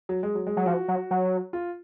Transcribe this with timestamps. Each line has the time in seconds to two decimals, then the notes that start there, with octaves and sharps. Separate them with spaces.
0.09 F#3
0.23 G#3
0.35 F#3
0.47 G#3
0.57 F#3
0.66 F3 F#4
0.88 F#3
1.11 F#3
1.53 F4